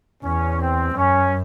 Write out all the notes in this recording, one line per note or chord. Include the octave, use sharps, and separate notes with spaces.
E2 C#4
C4
F#2 C#4